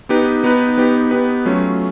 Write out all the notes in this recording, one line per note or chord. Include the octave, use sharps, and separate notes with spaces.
B3 D#4 G4 B4
B3 D#4 G4 B4
B3 D#4 G4 B4
B3 D#4 G4 B4
F#3 A3 C#4 F4